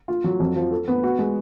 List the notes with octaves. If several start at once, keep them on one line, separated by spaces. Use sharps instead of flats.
F4
F#3
F2
F3
A4
B3
F#4
G#3